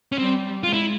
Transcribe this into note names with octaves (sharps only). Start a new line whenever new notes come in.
C#4
G3 C4
G#3 F4
E4